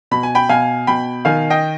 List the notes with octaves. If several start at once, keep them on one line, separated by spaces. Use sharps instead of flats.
B2 B5
G#5
G5 B5
B2 F5 G#5
B2 G5 B5
D#3 F5 G#5
D#5 G5